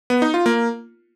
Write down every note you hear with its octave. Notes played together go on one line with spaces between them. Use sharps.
B3
D#4
F4
A#3